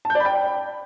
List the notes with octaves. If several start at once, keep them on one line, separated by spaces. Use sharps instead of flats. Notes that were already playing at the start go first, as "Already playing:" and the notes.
A5
G6
D5
B5
G5